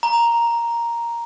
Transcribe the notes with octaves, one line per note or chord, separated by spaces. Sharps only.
A#5